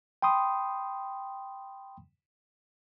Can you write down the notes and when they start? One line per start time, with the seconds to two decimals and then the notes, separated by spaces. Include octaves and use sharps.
0.22 G5 B5 C6 D#6